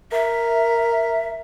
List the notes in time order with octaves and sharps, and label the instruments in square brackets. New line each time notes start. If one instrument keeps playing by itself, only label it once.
[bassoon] A#4 [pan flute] E5